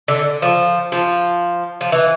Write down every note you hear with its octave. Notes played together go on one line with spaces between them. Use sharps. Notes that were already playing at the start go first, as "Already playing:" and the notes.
D3
F3
F3
F3
E3